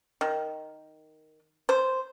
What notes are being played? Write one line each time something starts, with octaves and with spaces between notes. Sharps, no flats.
D#3
C5